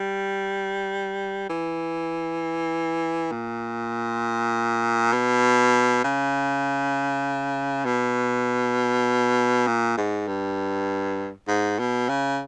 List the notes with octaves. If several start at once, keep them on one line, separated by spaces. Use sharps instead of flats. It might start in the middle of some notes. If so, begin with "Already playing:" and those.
Already playing: G3
E3
A#2
B2
C#3
B2
A#2
G#2
G2
G#2
B2
C#3